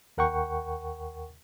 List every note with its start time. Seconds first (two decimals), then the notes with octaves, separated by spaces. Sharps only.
0.17 D#2 A#4 F#5 G5 C#6